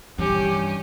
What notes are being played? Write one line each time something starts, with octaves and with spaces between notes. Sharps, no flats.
G2 E3 C#4 G4